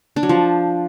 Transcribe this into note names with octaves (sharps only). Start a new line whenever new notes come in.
D4
F#3
F3